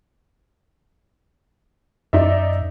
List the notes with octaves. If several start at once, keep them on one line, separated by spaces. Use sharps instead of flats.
F#2 D#4 D5 E5